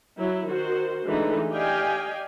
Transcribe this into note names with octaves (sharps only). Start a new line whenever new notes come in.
F#3 E4
D#3 F#4 C5
D3 E3 G#3 A3 D#4
G4 D5 D#5 F5 G5 G#5